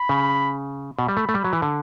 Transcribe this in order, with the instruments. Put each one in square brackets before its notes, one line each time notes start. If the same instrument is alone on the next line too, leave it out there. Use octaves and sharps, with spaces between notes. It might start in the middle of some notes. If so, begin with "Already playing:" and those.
Already playing: [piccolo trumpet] B5
[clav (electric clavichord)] C#3
[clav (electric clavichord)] B2 [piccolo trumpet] B5
[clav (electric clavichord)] G3
A3
A3
G3
F#3
E3
D3